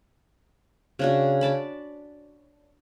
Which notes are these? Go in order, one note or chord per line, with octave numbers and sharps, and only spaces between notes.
C#3 D4 F#4
D5 A5 B5